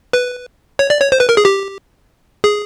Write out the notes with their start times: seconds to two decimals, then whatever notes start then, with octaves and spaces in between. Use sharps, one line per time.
0.13 B4
0.79 C#5
0.90 D5
1.01 C#5
1.12 C5
1.20 B4
1.29 A#4
1.37 G#4
1.45 G4
2.44 G#4